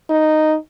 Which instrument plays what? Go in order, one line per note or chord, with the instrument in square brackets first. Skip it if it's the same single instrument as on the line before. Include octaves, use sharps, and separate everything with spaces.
[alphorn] D#4